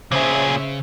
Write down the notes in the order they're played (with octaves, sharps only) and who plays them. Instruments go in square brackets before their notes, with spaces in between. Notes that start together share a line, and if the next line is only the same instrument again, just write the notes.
[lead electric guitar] A#2 G#4 [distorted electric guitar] C#3 [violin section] C5 C#5 E5